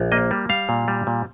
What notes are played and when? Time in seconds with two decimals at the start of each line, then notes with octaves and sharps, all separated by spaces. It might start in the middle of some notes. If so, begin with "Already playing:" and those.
Already playing: A#1
0.12 A#3 D#5
0.31 G3
0.49 G3 F5
0.69 A#2
0.88 G3
1.07 A#2